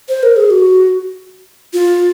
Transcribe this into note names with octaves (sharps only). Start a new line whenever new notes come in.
C5
A#4
G#4
F#4
F4